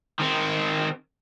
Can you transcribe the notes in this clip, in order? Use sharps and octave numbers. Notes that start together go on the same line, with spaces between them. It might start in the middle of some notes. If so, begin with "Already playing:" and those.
D#3 C4